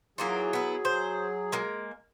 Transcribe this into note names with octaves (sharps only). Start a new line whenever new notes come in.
E3 F#3 A#3 F4 G#4
B3 E4
C5
G#3 A#3